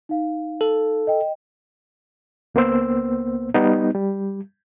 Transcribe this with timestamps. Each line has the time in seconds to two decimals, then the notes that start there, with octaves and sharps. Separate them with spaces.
0.09 D#4 F5
0.61 A4
1.07 D#5 G5
2.55 C#2 A#3 B3 C5 E6
3.54 G3 B3 D#4
3.95 G3